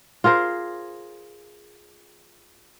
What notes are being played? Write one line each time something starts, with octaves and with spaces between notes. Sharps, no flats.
F4 G#4 A#4 C5